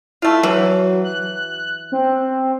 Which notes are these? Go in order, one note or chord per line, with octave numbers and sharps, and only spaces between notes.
A3 E4 F4
E3 F#3
F#6
C4